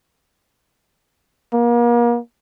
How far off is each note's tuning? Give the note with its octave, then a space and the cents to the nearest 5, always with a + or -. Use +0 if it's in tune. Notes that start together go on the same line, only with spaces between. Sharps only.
A#3 +35